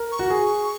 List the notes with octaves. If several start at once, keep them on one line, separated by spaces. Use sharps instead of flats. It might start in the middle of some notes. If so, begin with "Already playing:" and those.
Already playing: A#4
C#6
F#4
G#4